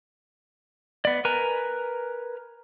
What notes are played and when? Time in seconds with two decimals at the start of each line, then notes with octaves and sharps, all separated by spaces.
1.05 B3 D5
1.25 A#4 B4 G#5 A#5